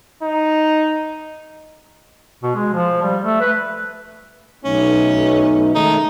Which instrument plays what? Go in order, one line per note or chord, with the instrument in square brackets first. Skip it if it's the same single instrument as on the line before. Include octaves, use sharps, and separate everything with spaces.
[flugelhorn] D#4
[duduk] B2
G#3
F3
G3
A3
B4
[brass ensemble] B1 A3 D#4 [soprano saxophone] C#4
[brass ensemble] D#3 G#3 A3 [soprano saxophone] D#4